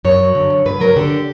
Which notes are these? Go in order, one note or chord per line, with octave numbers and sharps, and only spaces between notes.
F#2 C#5
F#3
D3
F#2
G2 B4
F#3 A#4
D3 G4